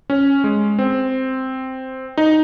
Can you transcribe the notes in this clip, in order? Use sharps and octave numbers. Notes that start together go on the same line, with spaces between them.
C#4
G#3
C4
D#4